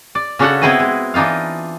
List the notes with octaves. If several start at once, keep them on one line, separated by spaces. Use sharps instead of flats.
D5
C#3 C#4 D4 F#4 A4 F#5
B3 C4 E4 G#4 B4 D#5
G#3
E3 D4 D#4 F4 F5